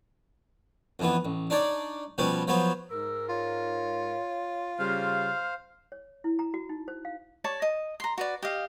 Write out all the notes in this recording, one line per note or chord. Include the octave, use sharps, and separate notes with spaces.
F2 E3 B3
A1
D4 D#4 C#5 D5
B2 F3 G3 C#4 B4
F3 F#3 B3 C5 C#5
G#2 A#4 E6
F4 C#5
C#3 G3 C5 F5 F6
C#5
E4
A#5
F#4
D#4
C5
F5
C#5 D5 A5
D#5
A#5 C6
F#4 B4 D5
G4 D#5 F5